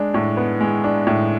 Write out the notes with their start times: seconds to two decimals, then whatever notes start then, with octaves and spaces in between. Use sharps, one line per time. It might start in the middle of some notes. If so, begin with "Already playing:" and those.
Already playing: G#3 D4
0.14 A2
0.37 B3
0.60 G#3
0.84 D4
1.07 A2